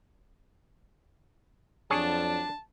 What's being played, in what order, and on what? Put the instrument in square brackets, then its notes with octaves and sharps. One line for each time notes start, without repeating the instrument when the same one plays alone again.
[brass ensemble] F2 F#3 [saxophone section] D4 [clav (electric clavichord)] G#4 C#5 [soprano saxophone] A5